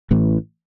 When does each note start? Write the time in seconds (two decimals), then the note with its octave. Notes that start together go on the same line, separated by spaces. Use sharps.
0.11 A1 A2 E3